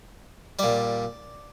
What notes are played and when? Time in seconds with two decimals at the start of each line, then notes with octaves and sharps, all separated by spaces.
0.59 A#2 G3 D5